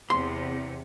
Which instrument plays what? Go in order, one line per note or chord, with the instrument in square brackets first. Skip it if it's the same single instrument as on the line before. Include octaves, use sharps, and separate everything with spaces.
[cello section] E2 C3 [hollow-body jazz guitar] C6